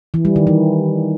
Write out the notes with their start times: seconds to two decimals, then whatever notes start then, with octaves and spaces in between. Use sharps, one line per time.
0.14 E3
0.25 G3
0.36 D#3
0.47 E3